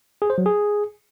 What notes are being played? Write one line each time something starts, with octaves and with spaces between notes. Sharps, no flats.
G#4
C5
F#3
G#4